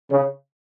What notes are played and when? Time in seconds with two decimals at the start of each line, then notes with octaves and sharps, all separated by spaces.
0.10 C#3